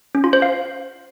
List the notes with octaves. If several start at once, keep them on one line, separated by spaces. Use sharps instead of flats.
C#4
F4
C5
F5